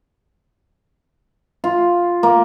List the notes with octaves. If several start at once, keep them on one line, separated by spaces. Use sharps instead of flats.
F4
A#3